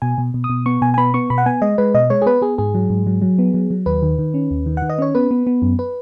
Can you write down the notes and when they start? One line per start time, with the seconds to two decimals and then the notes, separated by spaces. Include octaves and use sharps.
0.02 B2 G#5
0.18 B2
0.34 B2
0.44 D#6
0.50 B2
0.66 B3 C#6
0.82 B2 G#5
0.94 G#5
0.98 B3 B5
1.14 B3 C#6
1.30 B2 B5
1.38 F#5
1.46 B3 G#5
1.62 G#3 D#5
1.78 G#3 B4
1.94 B2 D#5
2.10 G#3 C#5
2.22 G#4
2.26 B3 B4
2.42 B3 G#4
2.58 G#2 G#4
2.74 F#3
2.90 G#2
3.07 F#3
3.22 F#3
3.39 B3
3.54 F#3
3.71 F#3
3.86 D#2 B4
4.02 D#3
4.19 D#3
4.34 C#4
4.51 D#2
4.66 D#3
4.77 D#3 F#5
4.90 D#5
4.98 C#4 C#5
5.15 B3 B4
5.31 B3
5.47 B3
5.62 F#2
5.79 B4